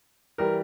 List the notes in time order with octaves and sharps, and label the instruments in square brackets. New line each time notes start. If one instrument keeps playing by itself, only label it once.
[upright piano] E3 G3 A#4